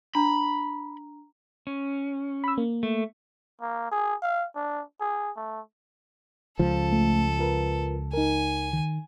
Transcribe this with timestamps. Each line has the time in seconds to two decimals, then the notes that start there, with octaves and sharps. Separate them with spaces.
0.15 D4 A#5 B5
1.67 C#4
2.44 B5 E6
2.58 A#3
2.83 A3
3.61 A#3
3.92 G#4
4.22 F5
4.56 D4
5.00 G#4
5.37 A3
6.59 C#2 F3 A4
6.92 A3
7.39 F4 A#4 B4
8.13 D#4 A#4 G#5
8.73 D#3